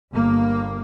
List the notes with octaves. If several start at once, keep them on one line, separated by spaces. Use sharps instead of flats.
G1 A#3